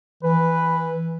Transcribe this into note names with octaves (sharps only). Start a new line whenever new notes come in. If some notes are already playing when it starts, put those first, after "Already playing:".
E3 B4